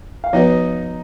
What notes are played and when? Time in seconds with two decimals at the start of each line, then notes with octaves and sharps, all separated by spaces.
0.24 F5
0.33 F3 B3 D#4 F#4 B4 D#5